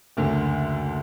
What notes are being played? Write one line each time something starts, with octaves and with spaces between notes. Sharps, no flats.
F#1 D2 D3